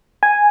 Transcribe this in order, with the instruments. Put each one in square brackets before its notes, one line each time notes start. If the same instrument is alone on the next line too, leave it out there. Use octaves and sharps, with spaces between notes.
[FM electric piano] G#5